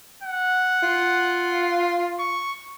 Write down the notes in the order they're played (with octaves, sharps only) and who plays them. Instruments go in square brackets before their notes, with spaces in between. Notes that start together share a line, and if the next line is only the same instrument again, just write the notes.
[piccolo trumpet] F#5
[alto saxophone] F4
[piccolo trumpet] C#6